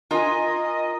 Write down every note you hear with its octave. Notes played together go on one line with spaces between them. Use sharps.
F4 A#4 D#5 G#5